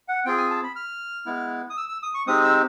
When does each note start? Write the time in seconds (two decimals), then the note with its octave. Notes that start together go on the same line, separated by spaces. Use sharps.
0.08 F#5
0.25 C4 F4 G#4 G5
0.38 G#5
0.50 A5
0.63 B5
0.76 F6
1.26 G#3 B3 E4
1.70 D#6
1.77 E6
1.89 E6
2.03 D#6
2.14 C#6
2.27 G#3 C4 D#4 G4 D#6
2.44 E6